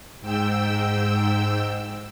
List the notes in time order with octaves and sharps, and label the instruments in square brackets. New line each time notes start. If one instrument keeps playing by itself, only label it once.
[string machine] G#2 G5 E6